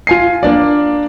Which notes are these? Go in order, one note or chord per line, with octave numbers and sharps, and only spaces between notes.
F4 G#5 C7
A#3 D4 D5